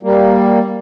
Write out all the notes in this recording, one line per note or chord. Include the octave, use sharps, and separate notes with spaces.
G3 A#3